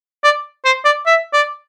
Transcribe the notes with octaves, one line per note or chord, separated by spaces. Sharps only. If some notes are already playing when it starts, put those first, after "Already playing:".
D5
C5
D5
E5
D5